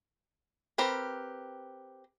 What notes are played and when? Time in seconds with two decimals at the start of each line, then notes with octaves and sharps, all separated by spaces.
0.78 C4 G4 A#4 B4